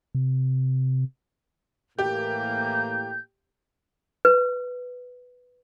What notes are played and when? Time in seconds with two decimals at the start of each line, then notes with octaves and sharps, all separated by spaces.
0.15 C3
1.99 A2 E3 A#3 G4 G6
4.25 B4